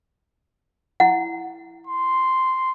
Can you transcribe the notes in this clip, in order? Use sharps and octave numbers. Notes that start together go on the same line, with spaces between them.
E4 F#5
C6